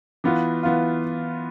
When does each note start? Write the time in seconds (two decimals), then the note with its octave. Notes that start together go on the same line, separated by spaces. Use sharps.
0.24 E3 B3 F4
0.63 E3 B3 F4